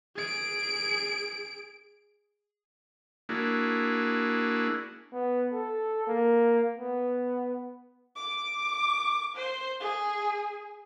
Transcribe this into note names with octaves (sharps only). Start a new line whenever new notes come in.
G#4 D7
A#3 D4 E4 F#4 G#4
B3
A4
A#3
B3
D6
C5
G#4